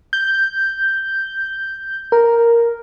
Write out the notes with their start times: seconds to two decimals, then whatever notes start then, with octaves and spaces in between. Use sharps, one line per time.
0.13 G6
2.12 A#4